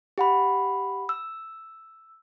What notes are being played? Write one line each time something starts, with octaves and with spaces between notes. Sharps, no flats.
G4 F#5 B5
E6